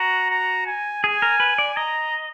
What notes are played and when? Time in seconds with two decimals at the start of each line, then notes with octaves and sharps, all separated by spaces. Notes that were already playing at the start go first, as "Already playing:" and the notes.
Already playing: F#4 A#5
0.30 A#5
0.66 G#5
1.04 G#4 G#5
1.22 A#4
1.40 B4
1.58 D5
1.77 D#5 A#5